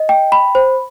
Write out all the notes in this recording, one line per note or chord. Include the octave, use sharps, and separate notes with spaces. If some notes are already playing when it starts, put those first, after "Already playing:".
Already playing: D#5
G5
B5
C5